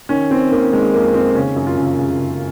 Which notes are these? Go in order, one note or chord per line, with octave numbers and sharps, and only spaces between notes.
D#3 C#4
D#3 C4
D#3 A#3
D#3 G#3
F2 A#3
D#3 C4
C#3 C#4
F#2
F4
C#3
C#3
C#3